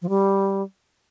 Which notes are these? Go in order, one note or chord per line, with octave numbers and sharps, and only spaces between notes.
F3
G3